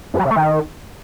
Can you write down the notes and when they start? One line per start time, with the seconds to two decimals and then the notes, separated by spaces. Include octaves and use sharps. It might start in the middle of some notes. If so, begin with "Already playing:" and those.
0.14 F#2
0.19 F#3
0.25 C3
0.31 A3
0.36 D#3